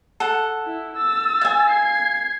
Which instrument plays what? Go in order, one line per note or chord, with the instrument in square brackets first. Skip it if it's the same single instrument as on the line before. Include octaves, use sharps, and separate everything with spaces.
[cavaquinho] A4 F#5
[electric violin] E4
E6 A6
[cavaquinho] F5 G#5
[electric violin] G#6 C7